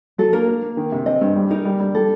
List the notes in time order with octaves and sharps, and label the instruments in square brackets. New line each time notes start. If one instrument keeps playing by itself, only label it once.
[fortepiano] F#3 [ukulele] A4
[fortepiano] A#3 [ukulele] A#4
[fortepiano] A#3
A#3
D#3
C3
[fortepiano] C4 [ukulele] D#5
[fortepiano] G2
G3
[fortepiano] D#4 [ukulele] A#4
[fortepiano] G3
G3
[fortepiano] G3 [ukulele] A4